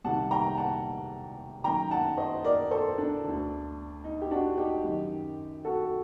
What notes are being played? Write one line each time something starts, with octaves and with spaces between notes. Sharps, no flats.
C2 C3 D#3 F#5 A5
G5 A#5
F#5 A5
F#2 D#3 G5 A#5
F#5 A5
C5 D#5
A#4 D5
A4 C5
D4
D2 D3
D#4
G4
D4 F#4
D#4 G4
F#2 D#3
F#4 A4